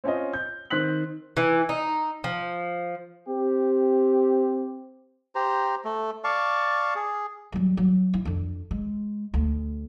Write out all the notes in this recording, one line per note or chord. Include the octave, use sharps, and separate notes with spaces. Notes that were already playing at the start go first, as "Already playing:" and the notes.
C4 C#4 F4 D#5
G6
D#3 C4 C6 F#6 B6 F#7
E3
D#4
F3
C4 G4
G4 C5 A#5
A3
D5 F5 A5 C#6
G#4
F#3 G3
F#3
E4
F2 D4
G#3
D2